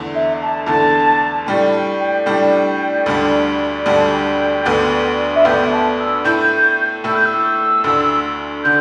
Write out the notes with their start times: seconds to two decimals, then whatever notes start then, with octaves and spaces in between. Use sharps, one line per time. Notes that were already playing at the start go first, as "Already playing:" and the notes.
Already playing: E2 D3 A3
0.14 E5
0.41 A5
0.66 E2 D3 A3 A5
1.35 A5
1.46 A2 G3 D4 G5
1.73 G5
1.99 G5
2.26 A2 G3 D4 G5
3.06 D2 D3 G3 D4
3.85 D2 D3 G3 D4 G5
3.93 A5
4.02 G5
4.65 D2 D3 B3 D4
5.35 E5
5.45 D2 D3 B3 D4 G5
5.71 A5
5.98 E6
6.24 A2 A3 E4 G6
7.03 A2 A3 E4 E6
7.15 G6
7.25 E6
7.84 D2 D3 A3
8.63 D3 G6